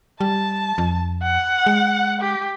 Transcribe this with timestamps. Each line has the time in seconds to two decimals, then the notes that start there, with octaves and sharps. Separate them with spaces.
0.20 G3 A5
0.78 F2
1.23 F#5
1.66 G#3
2.21 G4